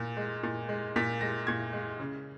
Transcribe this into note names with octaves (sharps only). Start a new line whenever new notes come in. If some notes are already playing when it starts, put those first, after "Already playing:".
Already playing: A#2
G#3
A#2
G#3
A#2 B6
G#3 A#6
A#2 G#6
G#3
C#3